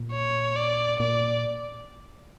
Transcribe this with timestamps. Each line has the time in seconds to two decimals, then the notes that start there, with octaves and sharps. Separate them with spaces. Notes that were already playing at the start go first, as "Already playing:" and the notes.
Already playing: A#2
0.12 C#5
0.56 D5
1.00 A#2 D5